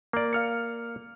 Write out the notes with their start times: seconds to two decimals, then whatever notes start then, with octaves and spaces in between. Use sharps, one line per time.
0.13 A#3 D5
0.33 F5 F6 C#7